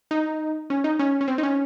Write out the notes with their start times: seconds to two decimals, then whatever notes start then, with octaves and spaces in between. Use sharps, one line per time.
0.11 D#4
0.70 C#4
0.84 D#4
0.99 C#4
1.21 C#4
1.28 C4
1.38 D#4
1.43 C#4